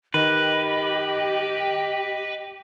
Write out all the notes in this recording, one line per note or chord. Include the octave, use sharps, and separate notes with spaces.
D#3 G4 B4 D#5